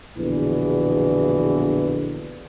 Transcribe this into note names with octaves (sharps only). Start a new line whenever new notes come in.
A#1 E2 B2 D3 E3